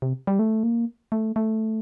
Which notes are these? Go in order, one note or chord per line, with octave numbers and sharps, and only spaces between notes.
C3
G3
A3
A#3
A3
A3